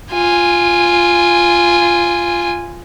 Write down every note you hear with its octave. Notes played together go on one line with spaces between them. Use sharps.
F4 G#5